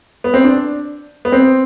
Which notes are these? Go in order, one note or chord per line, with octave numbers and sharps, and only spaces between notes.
B3
C4
D4
B3
C4